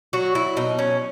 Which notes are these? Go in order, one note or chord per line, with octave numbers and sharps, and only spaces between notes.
F#3 F#4
E4
B2 D#4
C#4